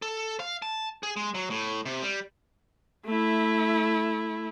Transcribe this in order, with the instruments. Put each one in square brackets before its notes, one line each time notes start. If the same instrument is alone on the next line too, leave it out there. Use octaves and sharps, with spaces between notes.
[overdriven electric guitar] A4
F5
A5
G#4
G#3
F#3
A2
C3
G3
[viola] A3 E4